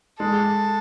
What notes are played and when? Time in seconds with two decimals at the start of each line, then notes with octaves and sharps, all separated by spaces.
0.20 G#3 A4